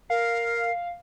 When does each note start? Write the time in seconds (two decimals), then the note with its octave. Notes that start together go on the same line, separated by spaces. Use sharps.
0.10 A#4 F5 C7